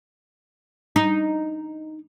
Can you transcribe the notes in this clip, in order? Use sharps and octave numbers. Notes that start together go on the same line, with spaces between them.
D#4